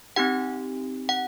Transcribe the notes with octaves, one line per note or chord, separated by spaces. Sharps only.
C4 D#4 G4 F#5
F#5